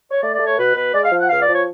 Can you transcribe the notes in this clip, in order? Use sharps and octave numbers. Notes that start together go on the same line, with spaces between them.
C#5
A3 D5
D5
A3
C#5
B2 B4
B2 B4
G#3 D5
F5
F3
F#5
C#2 F5
D5
F3
C#5